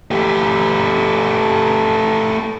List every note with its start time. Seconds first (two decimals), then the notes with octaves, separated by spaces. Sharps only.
0.11 A3 G4